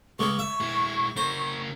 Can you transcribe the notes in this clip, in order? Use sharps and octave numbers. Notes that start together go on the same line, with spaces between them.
C#2 G#3 C#6
E5
G#3 E4
C#3 A#4 C5